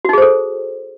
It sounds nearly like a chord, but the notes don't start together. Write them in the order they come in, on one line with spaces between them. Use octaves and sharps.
F#4 D#4 G#4 C5 A4